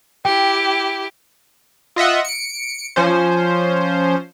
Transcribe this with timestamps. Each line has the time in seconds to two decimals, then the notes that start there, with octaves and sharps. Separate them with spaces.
0.25 E4 G4 G5
1.96 F4 D#5 E5 F#5
2.25 C#7 D7
2.96 F3 C#4 C5